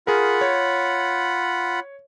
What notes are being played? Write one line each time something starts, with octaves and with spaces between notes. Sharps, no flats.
F4 G#4 A#4 F#5 B5
C#5